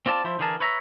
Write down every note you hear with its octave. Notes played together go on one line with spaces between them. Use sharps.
C4 F4 D5 A5
F3 E4 C5
D3 E3 G#4 A#4 A5
B4 C#5 E5 A#5